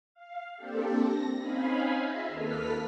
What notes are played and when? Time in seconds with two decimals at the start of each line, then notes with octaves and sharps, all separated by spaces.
0.14 F5
0.57 A#3 C4 D4 G4 A4
0.99 A#6
1.38 C4 C#4 D#4 F5 G#5 B5
1.97 F4 G#4 D#5 E5
2.28 D#2 A#3 A4 B4 F6 B6